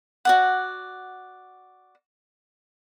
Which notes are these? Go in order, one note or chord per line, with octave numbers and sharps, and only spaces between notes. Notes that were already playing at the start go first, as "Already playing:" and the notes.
F#4 D5 F#5